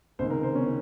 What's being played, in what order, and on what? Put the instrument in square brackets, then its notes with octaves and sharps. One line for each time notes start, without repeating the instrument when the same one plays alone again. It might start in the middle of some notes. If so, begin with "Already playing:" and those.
[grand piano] C#2 C3 D#3 C5
A#4
C5
C#4